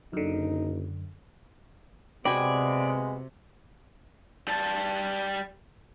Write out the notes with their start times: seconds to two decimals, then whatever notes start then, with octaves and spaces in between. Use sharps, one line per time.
0.13 F#1 F#2 D3 D#4
2.25 C3 G#3 B3 F#4 D5 G5 G#5 B5
4.48 G3 A5